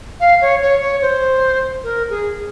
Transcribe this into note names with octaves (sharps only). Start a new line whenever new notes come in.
F5
C#5
C#5
C#5
C5
A#4
G#4